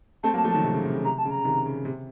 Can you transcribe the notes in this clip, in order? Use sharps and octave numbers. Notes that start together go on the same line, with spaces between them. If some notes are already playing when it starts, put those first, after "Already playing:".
A3 C4 A5
F#3 A#3
A5
F3 A3
D#3 F#3 A5
C3
C#3
C3
C#3
C3 A#5
A5
C#3
A#5
C3 D#3
C#3
C3